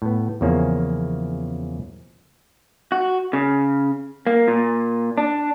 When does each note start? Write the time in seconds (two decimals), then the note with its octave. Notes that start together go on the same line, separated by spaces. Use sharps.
0.02 A2 B3
0.41 E2 C#3 F3 A#3 C#4
2.92 F#4
3.33 C#3
4.27 A#3
4.48 A#2
5.18 D4